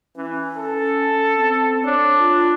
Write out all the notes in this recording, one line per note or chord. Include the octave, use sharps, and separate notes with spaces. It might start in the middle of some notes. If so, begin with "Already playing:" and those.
E3 C#4
A4
C4
D4 C#5
F4